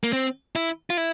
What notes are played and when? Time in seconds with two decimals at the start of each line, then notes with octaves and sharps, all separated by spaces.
0.04 A#3
0.13 C4
0.56 E4
0.90 F4
0.97 E4